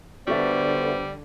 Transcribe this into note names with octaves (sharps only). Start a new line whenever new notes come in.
D3 G3 B3 F#4 A4 C5 E5